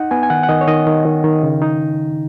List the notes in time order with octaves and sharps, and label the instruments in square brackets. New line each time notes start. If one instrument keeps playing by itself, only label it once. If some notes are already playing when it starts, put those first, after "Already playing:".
Already playing: [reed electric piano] D#4 F#5
B3 G#5
G#5
D#3 F#5
F#5
D#3 D#5
C#5
D#3 D#5
D#3
D#3
D#3
C#3
D#4